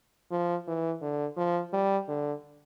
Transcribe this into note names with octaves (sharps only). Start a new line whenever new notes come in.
F3
E3
D3
F3
G3
D3